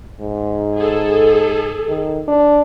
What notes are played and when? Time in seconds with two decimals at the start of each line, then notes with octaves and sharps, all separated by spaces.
0.20 G#2
0.78 G#4 A4
1.88 D#3
2.28 D4